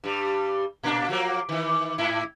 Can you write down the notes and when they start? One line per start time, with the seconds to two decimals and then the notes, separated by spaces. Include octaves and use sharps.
0.04 G2 G3
0.83 A#2 A#3 D4
1.09 F3 F#3 A#3
1.49 D#3 E3
1.98 G#2 E4